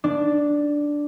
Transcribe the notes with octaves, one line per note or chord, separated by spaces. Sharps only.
D4